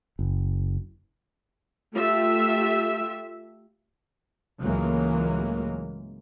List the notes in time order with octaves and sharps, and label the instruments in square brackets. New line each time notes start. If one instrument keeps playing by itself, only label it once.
[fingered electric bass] F#1
[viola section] A3 F4 G4 E5
[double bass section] C#2 A2 E3 F#3 G#3 A#3